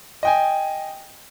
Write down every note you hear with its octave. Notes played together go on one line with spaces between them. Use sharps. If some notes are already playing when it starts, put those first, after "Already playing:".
D#5 G5 G#5